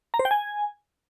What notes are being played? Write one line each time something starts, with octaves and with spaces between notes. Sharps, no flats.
A#5
C5
G5
G#5